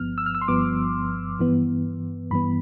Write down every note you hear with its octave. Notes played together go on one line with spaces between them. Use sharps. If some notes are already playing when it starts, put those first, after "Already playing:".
Already playing: G1 G2 F3 B3 F6
E6
F6
E6
C6
G1 G2 F3 B3 D6
G2 E3 B3
G2 E3 B3 B5